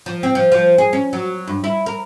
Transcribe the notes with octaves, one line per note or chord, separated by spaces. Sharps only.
F3
C4
F3
F3
G#4
C#4
F#3
G2
E4
A#4